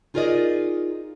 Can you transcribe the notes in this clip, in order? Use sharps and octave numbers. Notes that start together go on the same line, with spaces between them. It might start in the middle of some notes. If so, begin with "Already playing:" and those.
D#4 F4 G#4 A#4 D5 D#5